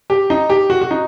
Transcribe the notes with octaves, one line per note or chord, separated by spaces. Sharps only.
G4
D#4
G4
F#4
F#4
D#4